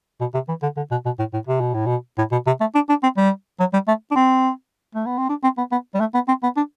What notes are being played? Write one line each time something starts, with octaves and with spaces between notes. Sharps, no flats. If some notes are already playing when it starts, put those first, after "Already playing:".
B2
C3
E3
D3
D3
B2
B2
A2
A2
C3
B2
A2
B2
A2
B2
C3
A3
D4
D4
C4
G3
F#3
G3
A3
D4
C4
A3
B3
C4
D4
C4
B3
B3
G3
A3
B3
C4
B3
D4